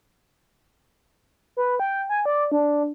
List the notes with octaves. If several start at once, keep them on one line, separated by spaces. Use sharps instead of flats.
B4
G5
G#5
D5
D4